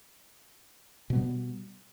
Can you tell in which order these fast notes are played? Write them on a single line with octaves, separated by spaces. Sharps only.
B2 B3 G3